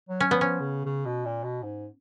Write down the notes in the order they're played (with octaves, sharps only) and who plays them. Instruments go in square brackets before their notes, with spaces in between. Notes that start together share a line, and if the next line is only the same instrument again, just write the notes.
[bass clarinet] F#3
[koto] C#4
[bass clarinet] F3 [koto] B3
[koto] C#4
[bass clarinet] C#3
C#3
B2
A#2
B2
G#2